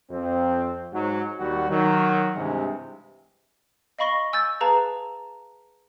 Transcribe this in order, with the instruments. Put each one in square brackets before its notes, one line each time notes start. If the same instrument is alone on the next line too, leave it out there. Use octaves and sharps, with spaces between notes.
[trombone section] F2 C4
G#2 F#3
D#2 G3 F#4
D#3 F#3
G2 C3 E3 G#3
[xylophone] D#5 F5 B5 C#6 A#6 G7
G#5 E6 G6 A6
G#4 B4 F5 A5 A#5